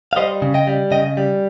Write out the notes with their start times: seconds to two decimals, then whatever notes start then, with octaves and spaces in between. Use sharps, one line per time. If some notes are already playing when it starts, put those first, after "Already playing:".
0.13 F5
0.16 G3 C5 D#5
0.42 C#3
0.54 D#5 G5
0.67 G3
0.91 C#3 D#5 G5
1.17 G3